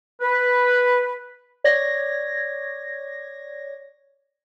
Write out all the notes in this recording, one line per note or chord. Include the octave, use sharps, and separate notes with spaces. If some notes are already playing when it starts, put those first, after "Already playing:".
B4
C#5 D5 G#6 A#6